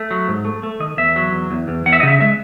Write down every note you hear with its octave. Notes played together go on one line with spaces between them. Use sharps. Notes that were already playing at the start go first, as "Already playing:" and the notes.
Already playing: A3
F#3
G#2
A3
A3
D#3 D#5
E2 E5
F#3
E2
E2
E2
E2 F#5
E5
D#5
C#3 E5
G#3 E5